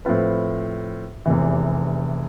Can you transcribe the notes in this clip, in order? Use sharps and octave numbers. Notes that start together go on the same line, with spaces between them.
A2 F3 C4 F4 B4
F1 E2 C3 E3